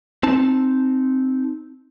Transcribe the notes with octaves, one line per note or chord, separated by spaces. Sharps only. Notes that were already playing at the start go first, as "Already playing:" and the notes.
C4 D#4 A5